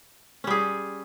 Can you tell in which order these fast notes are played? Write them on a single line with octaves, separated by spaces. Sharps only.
C#4 G3 G#4